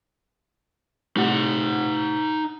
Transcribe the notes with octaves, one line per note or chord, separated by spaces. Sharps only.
A2 C3 D#4 F#5